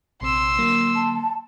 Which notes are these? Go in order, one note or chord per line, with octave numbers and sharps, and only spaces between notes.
A#1 C3 C4 C6 E6
D3 F#3 A#3
A5